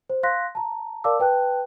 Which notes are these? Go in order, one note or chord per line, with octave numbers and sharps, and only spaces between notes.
C5
F5 C6 F#6 A#6 B6
A5 A#5
A#4 D5 F5 A5 D6 E6
B4 G5 A5 F#6